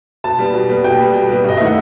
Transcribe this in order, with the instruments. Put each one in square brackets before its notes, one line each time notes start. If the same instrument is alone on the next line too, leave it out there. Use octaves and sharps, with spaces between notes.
[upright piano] B2 A5
G3 B3
B2
G3 B3
B2 G5
G3 B3
B2
G3 B3
G2 D#5
D#3 A3 E4 E5
F#5